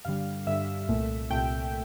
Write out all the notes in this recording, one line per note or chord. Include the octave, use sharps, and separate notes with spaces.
G2 D3 G3 F5
G2 D3 G3 E5
C2 A#2 A3
C2 A#2 A3 G5